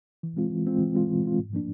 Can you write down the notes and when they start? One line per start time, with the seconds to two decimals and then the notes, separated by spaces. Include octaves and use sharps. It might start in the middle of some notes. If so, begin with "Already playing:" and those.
0.23 E3
0.37 G#3 C4 F4
0.52 E3
0.67 G#3 C4 F4
0.81 E3
0.95 G#3 C4 F4
1.10 E3
1.24 G#3 C4 F4
1.39 G#2
1.53 F3 A#3 D4